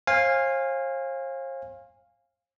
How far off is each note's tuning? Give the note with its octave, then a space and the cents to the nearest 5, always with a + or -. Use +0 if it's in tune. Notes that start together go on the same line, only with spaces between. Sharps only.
C5 +45 F5 +0 G#5 -25